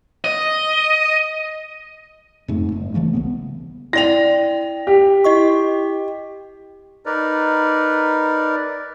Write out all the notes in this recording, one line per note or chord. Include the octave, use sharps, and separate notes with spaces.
D#5
F2 G#2 C#3 A3
F#1
C#3 E3 A3 A#3
C2 C#3 B3
E4 D5 G5 A#6 F7
G4
E4 D#5 C#6
D#4 A#4 B4 D5